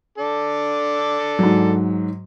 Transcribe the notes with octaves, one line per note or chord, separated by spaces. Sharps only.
D4 A4
G#2 F#3